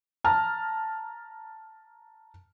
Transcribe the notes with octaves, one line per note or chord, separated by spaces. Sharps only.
A5 A#5 F6